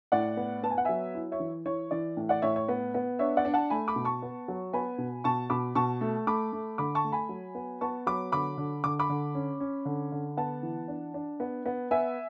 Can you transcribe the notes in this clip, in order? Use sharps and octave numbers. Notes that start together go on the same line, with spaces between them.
A2 D5 F#5
B3
B3 A5
G#5
F#5
F#3 E5 G#5
E4
C#5 E5
E3
E3 C#5
E3 D5
A2
D5 F#5
A2 C#5 E5
C#5
B3
B3
D4 C#5 E5
D5 F#5
D4
F#5 A5
A3 G#5 B5
B5 D6
B2
A5 C#6
B3
F#3
B3 G#5 B5
B2
B2 A5 C#6
B2 B5 D6
B2 A5 C#6
A3
A3 B5 D6
A3
D3 B5 D6
A5 C#6
A3
G#5 B5
F#3
B3
B3 A5 C#6
F#3 B5 D6
D3 B5 D6
D3
D3 D6
B5 D6
D3
C#4
C#4
D3
D3
B3 F#5 A5
E3
D4
D4
B3
B3
B3 E5 G#5